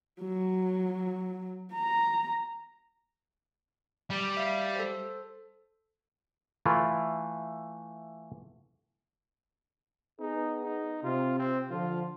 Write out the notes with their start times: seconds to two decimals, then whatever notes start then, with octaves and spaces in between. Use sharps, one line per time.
0.20 F#3
1.73 A#5
4.10 G3
4.37 E5 F5
4.76 A4 C5
6.66 E3 A3 E4 F4
10.20 B3 D#4 G#4
10.63 D#4
11.04 C3 F4
11.39 C4
11.70 D3 F3 F4